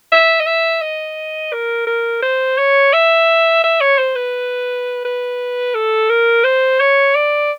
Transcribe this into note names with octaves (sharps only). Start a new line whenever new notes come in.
E5
D#5
E5
D#5
A#4
A#4
C5
C#5
E5
E5
C#5
C5
B4
B4
A4
A#4
C5
C#5
D5